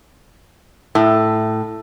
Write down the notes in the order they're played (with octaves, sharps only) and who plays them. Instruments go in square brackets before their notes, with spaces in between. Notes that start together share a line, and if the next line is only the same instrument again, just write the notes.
[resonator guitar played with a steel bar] A2